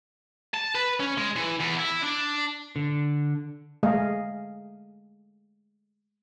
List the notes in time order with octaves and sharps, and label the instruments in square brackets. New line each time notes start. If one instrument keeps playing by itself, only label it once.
[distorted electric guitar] A5
B4
C#4
G#3
E3
E2
E4
D4
[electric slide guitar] D3
[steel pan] G#3 A3 G#4 A4 D#5 F5